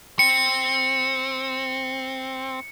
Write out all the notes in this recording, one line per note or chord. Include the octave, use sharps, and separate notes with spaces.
C4 C#7